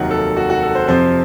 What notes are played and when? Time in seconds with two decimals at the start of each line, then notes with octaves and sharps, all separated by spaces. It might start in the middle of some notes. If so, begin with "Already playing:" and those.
Already playing: F1 D#2 D#3 F#3 F#5
0.11 A4
0.37 F#4
0.50 F#4
0.62 A4
0.75 C5
0.87 F2 C3 F3 C5